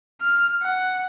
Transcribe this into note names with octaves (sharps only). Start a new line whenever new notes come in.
F6
F#5